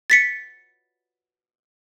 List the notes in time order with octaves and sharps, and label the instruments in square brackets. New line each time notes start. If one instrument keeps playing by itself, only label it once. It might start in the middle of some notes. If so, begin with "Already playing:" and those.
[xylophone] A6 B6 C#7